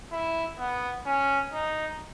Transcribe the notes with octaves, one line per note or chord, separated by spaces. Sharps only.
E4
B3
C#4
D#4